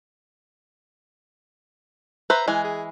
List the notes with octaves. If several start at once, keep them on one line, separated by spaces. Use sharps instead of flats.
B4 C5 E5 A#5
E3 G#3 G#5
G#4